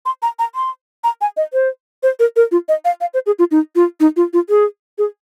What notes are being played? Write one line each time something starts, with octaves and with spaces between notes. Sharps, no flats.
C6
A#5
A#5
C6
A#5
G#5
D#5
C5
C5
A#4
A#4
F4
D#5
F5
F5
C5
G#4
F4
D#4
F4
D#4
F4
F4
G#4
G#4